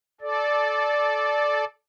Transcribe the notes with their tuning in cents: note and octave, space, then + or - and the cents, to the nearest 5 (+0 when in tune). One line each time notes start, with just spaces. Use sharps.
A4 -25 D5 +0